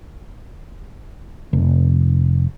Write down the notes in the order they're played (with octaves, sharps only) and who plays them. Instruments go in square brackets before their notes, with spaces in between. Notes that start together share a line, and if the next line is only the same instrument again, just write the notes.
[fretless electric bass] F1